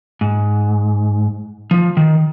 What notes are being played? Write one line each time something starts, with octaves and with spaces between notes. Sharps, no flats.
G#2
F3
D#3